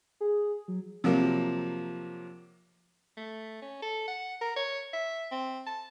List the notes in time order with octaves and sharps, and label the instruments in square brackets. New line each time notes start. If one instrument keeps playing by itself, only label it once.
[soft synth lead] G#4
F#3
[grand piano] C3 F3 F#3 A#3
[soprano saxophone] A3
C#4
A4
F#5
A#4
C#5
E5
C4
A5